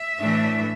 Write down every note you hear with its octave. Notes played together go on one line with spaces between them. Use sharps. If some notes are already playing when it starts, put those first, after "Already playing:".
Already playing: E5
A2 E3 A3 D4